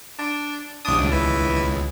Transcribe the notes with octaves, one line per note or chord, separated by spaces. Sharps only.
D4
C2 D4 D#6
C#2
E3